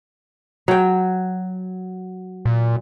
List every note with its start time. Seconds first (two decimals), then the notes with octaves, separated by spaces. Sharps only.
0.68 F#3 G5
2.45 A#2